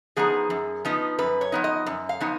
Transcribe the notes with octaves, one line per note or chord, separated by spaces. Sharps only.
F3 B3 D#4 G#4
F#2
F3 B3 D#4
F#2 B4
C#5
F3 B3 D#4
D#5
F#2
F5
F3 B3 D#4